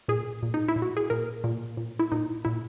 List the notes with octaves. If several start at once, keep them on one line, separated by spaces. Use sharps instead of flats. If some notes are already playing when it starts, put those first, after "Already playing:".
A#2 G#4
A#2
D#4
E4
A#2
F#4
G#4
A#2 A#4
A#2
A#2
E4
A#2 D#4
A#2 E4